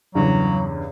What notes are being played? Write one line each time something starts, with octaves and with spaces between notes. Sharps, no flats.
E2 G2 C#3 F#3 D5